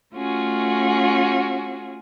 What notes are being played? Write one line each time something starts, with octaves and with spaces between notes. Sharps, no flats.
A3 C#4 F4 F#4 G#4